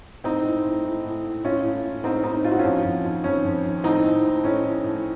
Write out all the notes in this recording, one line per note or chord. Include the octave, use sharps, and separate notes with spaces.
A2 C4 D#4
A2
A2
A2
A2
A2
A2 C#4 F4
A2
A2
A2 C4 D#4
A2 C4 D#4
A2 F4
F#4
F2 C#4 F4
F2
D#3
F2 C#4
F2
D#3
A2 C4 D#4
A2
A2
A2 C#4
A2
A2